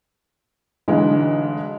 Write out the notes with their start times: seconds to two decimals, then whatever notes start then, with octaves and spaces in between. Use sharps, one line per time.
0.88 B1 D3 E3 G#3